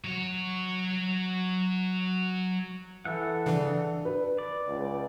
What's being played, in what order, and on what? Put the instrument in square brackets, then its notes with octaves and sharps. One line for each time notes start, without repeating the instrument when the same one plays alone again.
[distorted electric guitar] F#3 C#5
[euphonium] E3 [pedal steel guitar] A4 E5 F#5
[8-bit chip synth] C#3 E3 [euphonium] D4
[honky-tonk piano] B4
[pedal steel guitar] D5
[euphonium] C#2